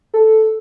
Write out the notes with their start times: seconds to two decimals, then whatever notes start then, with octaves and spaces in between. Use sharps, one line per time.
0.14 A4